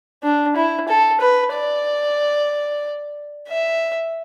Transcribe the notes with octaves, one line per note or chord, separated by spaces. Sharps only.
D4
E4
A4
B4
D5
E5